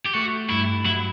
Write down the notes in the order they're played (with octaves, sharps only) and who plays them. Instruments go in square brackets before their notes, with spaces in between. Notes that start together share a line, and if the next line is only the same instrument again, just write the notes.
[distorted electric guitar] G4
[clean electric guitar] A3 [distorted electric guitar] F#4
[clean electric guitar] G2 [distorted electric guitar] E4
[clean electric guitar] F#3 [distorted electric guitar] E4